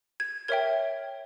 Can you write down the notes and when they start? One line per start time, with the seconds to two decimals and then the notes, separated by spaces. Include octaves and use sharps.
0.20 G#6
0.48 A#4 C#5 E5 G5 G#6